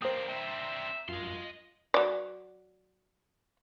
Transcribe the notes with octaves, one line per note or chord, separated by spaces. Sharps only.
A#3 C4 D4 C5 G5 A#5 D#6 C7
E5 G5 A#5 C6
F#2 F4 D#5 C6
F#3 D5